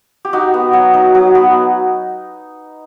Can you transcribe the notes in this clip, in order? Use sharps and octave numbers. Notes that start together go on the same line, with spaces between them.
G4
D#4 F#4
B3
F#3
D#4
F#3
B3